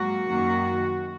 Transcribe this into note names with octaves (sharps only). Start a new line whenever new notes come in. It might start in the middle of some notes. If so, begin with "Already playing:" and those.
Already playing: G#2 F#3 A#3 F#4
F#2 D#3 A#3